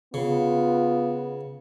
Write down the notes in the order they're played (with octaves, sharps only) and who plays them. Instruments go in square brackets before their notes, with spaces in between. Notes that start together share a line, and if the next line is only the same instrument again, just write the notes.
[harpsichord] C#3 [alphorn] B3 [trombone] F4